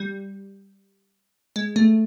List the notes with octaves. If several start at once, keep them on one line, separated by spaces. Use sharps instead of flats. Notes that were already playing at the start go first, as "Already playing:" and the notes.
Already playing: G3
G#3
A3